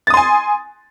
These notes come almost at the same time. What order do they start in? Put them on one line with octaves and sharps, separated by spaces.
A6 D#6 C6 G#5